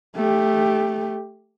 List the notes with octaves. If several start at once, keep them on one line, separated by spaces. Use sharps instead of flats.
A3 G4